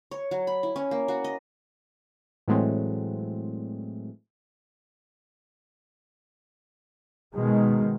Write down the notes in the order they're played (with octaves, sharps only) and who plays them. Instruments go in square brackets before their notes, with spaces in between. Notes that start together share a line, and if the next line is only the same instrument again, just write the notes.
[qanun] C#5
F#3
B5
E4
C#4
A#3
F#4
D#5
[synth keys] A2 E3 F#3 G#3 A3 C4
[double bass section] B2 D#3 G#3